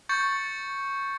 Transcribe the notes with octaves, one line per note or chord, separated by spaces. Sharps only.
C#6 G6 A6 C#7